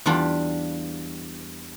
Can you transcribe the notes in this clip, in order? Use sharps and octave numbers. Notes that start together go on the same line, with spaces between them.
E2 G3 D4 F4